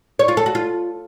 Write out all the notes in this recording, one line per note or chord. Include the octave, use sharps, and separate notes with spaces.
C#5
F4
A4
F#4
F4